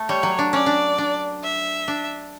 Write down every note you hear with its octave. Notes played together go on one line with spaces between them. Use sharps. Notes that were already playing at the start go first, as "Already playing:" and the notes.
Already playing: A3
G3 C#5
F#3
D4
C#4 D5
D4
D4
E5
D4